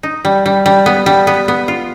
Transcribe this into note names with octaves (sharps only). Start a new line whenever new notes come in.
D#4
G3
G3
G3
B3
G3
B3
B3
F4